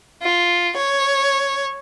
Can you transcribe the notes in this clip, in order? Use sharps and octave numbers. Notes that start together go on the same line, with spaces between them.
F4
C#5